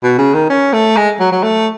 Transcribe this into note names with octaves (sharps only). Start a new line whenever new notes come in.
B2
C#3
D#3
C#4
A3
G#3
F#3
F#3
A3